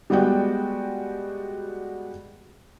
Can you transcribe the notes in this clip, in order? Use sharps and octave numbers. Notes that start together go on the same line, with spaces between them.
G3 G#3 B3 F#4 D5 G5